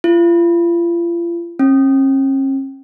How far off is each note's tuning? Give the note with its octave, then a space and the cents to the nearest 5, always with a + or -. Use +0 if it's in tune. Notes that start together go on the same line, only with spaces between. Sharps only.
F4 -40
C#4 -45